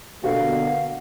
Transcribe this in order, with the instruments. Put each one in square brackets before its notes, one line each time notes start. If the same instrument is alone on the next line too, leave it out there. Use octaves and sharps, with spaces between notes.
[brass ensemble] B2 D3 A#3 [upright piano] F#4 [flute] F5